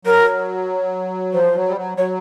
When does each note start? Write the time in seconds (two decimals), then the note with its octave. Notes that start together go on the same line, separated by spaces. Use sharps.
0.05 F#3 A#4
1.33 F3 C5
1.55 F#3
1.69 G3
1.77 F#3
1.98 F#3 C#5